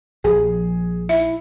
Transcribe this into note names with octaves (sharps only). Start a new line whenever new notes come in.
A#1 F3 G#4
E4 E5